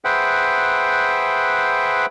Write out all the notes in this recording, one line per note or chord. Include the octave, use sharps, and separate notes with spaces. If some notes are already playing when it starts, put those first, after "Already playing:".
G#4 B4 C5 E5 F#5 G5